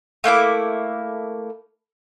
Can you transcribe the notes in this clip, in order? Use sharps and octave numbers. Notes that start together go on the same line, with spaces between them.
A3 A#3 E4 D6